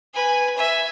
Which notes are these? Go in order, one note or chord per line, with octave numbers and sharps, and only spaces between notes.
B4 G#5
E5 G#5